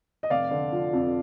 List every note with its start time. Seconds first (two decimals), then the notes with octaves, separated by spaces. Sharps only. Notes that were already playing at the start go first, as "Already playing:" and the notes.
0.23 D#5
0.30 F1 D5 F5
0.51 D3
0.72 F3
0.93 F2